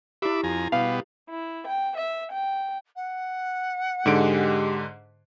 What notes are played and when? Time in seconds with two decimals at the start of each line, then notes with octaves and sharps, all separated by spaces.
0.22 E4 G4 E5 B5 D6
0.44 F2 G#5 A#5
0.72 B2 G3 B3 F5
1.28 E4
1.66 G5
1.96 E5
2.30 G5
2.96 F#5
4.06 G#2 D3 G#3 G4 D7